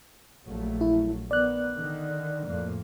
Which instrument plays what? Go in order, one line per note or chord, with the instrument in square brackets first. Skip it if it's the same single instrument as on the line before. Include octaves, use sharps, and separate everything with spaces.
[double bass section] A#1 F#3 A3
[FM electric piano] E4
[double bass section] D#3 B3 [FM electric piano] D5 F#6
[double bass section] D3 D#3
F2 A2 A#3